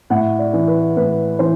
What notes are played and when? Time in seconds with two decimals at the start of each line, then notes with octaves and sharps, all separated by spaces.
0.10 A2 F#5
0.39 D5
0.53 E3
0.68 B4
0.96 A2 B4
1.39 E3 C5